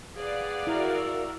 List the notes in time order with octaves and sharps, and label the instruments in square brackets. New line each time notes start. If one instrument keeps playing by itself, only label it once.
[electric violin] G#4 B4 [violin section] D5 F5 F#5
[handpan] E4 [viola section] F#4 A#4
[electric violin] E6